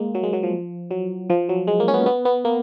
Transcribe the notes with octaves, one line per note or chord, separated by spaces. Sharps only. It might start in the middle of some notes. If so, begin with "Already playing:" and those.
Already playing: G#3 A#3
F#3
G#3
F#3
F3
F#3
F3
F#3
G#3
A#3
C#4
B3
B3
B3
A#3